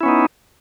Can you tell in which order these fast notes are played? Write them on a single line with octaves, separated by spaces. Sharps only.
E4 C#4 B3 D#4